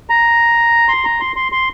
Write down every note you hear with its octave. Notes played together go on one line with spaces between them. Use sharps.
A#5
C6
A#5
C6
C6
C6